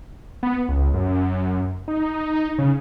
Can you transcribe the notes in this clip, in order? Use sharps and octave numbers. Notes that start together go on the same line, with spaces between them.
B3
C#2
F#2
D#4
C#3